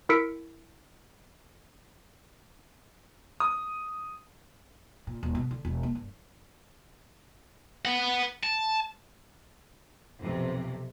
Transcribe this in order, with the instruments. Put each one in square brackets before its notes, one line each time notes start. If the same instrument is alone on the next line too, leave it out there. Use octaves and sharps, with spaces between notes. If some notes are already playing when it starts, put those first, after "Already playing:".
[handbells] E4 A#4 E6 B6 C#7 D7
[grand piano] D#6
[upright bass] A#2
D#1
B2
D3
E1
A#3
G2
[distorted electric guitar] B4 F#5
A5
[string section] B1 F2 C3